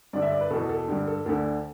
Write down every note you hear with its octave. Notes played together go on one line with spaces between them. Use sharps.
G2 D3 D5
E5
D5
B4
E2 B2 A4
A4
G2 D3 G4
A4
D2 D3 A4